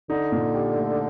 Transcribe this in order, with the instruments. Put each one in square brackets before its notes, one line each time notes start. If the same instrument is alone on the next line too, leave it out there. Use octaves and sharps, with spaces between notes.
[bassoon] D3 [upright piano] D#4
[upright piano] A#2
G4
A3